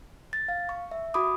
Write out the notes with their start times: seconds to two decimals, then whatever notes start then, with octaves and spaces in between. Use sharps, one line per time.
0.33 A6
0.48 F5
0.69 C#6
0.91 E5
1.14 F#4 B5 D6 D#6